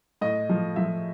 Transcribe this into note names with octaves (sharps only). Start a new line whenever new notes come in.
A2 D#5
F3
F3 E5